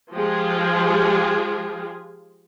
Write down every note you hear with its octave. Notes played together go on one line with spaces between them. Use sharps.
F3 G#3 F4 G4 G#4